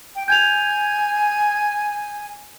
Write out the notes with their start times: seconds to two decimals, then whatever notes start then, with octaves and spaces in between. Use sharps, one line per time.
0.16 G5
0.28 G#5 G6 G#6 F7